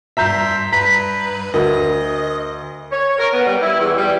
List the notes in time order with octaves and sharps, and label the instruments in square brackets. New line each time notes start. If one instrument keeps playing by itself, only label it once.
[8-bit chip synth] G2 C6 B6 [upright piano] E5 A#5 G6
[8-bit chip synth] G2 B4 [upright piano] A#5 [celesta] B6
[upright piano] D2 [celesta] A#4 [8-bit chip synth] D#5
[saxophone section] C#5
A#4
B3
G3
E4
E2
G3